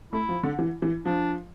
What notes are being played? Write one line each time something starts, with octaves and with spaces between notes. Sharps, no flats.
A3 E4
F3
D3
E3
E3
F3 D4